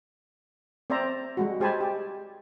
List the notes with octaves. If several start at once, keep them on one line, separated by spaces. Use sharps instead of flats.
C4 C5 D5 E5 A#5
G3 G#3 F#4
G#3 G4 C5 G#5 A5 B5
G4